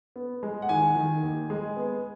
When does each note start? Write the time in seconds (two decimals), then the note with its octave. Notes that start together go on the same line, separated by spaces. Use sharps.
0.16 B3
0.43 G#3
0.62 F#5
0.69 D#3 G#5
0.96 D#3
1.22 D#2
1.50 G#3
1.77 B3